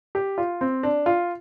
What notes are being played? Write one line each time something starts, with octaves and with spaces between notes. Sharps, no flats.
G4
F4
C4
D4
F4